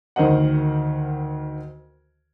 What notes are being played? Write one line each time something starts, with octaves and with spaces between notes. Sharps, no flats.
D2 D#3 A#4 C5 D#5 F#5